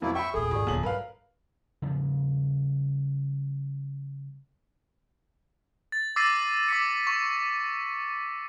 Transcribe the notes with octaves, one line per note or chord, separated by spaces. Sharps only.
F2 B2 A#3 E4
E5 G5 B5 C#6
E2 A#2 G#4 A4
G#1 D#2 F4 G4 D5
D#1 B1 D3 G#5 F#7
G2 A#4 B4 F5
C#3 F3 G3
A6
D6 E6 A6 A#6 C7 D#7
D6 B6 C#7
C#6